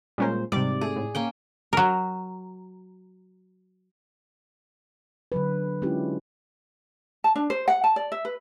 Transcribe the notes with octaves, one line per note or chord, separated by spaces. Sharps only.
A#2 G3 G#3 C#4 A#4 C5
G#2 C3 G3 D5 D6
A3 G#4
A2
A#3 C#4 G5
F#3 A#4
D3 F#3 B4
G#3 C#4 D4 E4 F4 G4
A5
D4
C5
F#5
A5
D5
E5
B4